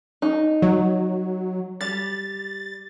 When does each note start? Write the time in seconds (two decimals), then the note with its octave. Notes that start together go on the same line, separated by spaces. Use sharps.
0.22 D#4
0.62 F#3
1.81 G3 A6